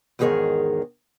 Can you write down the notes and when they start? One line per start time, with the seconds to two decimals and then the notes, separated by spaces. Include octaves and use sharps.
0.19 E2 G#2 D#3 G#4 A#4 C#5